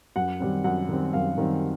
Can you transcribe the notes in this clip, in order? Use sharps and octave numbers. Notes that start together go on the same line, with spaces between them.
F#2 F#5
D#3 G3 C4
F#2 F#5
D#3 G3 C4
F#2 F5
D#3 G3 C4